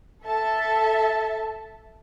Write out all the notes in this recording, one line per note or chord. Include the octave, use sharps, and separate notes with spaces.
A4 E5 A5